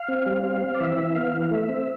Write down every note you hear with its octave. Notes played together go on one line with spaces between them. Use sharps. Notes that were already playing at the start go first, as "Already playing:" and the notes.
Already playing: F5
C4
G3
C4
C4
D5
E3 E5
E3
B3 F5
E3
F5
A3 E5
C4